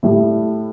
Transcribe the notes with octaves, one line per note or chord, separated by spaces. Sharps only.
A2 G3 E4